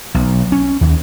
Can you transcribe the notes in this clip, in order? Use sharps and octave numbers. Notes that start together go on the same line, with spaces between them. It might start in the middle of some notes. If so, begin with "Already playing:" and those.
B1
C#4
D#2